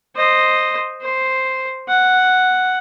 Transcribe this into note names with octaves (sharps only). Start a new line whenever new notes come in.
C5 D#5
C5
F#5